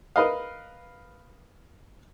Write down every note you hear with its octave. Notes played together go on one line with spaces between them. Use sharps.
A#4 B4 D#5 F5